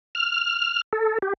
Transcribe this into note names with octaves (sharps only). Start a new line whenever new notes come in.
F6
A4
G4